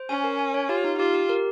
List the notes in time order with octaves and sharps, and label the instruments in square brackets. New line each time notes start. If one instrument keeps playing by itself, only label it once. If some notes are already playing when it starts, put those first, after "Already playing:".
Already playing: [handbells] C5
[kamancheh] C#4 [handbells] G#5
[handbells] A#4
G#5
C#5
[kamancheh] F4 [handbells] G4
[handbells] D#4
[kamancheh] F4 [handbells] G4
[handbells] G4
A#4